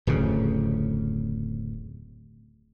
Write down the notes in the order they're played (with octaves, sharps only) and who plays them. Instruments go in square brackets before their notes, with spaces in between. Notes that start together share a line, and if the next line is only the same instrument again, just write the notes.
[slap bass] D1 F2 C#3